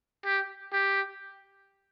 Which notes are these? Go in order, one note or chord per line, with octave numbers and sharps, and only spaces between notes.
G4
G4